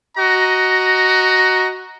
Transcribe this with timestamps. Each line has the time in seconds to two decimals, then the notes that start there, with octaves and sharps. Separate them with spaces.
0.17 F#4 D#5 A#5